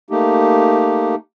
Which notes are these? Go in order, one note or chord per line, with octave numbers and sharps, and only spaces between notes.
A3 A#3 D#4 G4